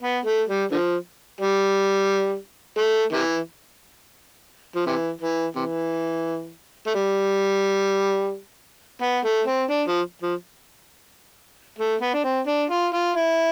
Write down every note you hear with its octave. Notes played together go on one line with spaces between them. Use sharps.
B3
A3
G3
D3 F3
G3
A3
C3 E3
F3
C3 E3
E3
C3 E3
A3
G3
B3
A3
C4
D4
F3
F3
A3
B3
D4
C4
D4
F4
F4
E4